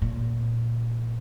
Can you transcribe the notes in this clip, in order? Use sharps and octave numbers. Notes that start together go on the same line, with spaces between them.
A#2